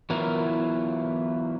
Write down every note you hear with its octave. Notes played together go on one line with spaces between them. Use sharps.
E3 F#3 B3 E4 F4 A#4